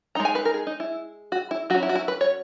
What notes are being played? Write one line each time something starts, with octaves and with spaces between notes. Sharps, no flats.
G#3 D#4 A#5
G#5
B4
A#4
G#4
D#4
E4
F#4
E4
F#3 C#4 F#4
E4
F#4
E4
B4
C#5